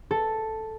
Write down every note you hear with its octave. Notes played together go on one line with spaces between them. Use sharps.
A4